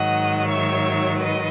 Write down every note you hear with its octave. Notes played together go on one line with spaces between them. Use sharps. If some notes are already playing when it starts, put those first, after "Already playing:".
Already playing: G#2 D#3 F#3 D#5 F#5
C#5 E5
B4 D#5